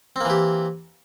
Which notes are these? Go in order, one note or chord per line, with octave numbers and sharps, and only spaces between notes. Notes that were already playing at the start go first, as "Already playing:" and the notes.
E3 A#3 C4 G4